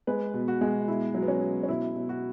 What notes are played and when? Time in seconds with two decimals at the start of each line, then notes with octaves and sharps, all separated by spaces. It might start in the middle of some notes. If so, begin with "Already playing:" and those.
0.07 G#3 B4
0.34 B2
0.48 F#4
0.61 G#3
0.88 B2 E4
1.15 F#3
1.22 B3
1.28 C#4
1.42 B2
1.63 C#4
1.69 B2 E4
1.95 B2
2.09 F#4